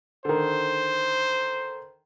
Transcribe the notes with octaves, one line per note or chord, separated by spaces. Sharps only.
D3 D#3 C5